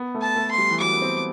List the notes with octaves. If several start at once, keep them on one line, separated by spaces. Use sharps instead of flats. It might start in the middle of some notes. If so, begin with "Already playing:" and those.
Already playing: B3
A3
A5
A3
C6
G3
E3
F#3 D6
B3
C4